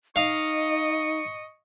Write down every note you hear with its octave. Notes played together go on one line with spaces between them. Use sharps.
D#4 D#5 F5 C#6